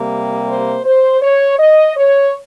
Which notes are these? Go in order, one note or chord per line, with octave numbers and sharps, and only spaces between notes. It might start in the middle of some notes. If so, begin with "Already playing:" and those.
Already playing: C3 G3 A#3
C5
C5
C#5
D#5
C#5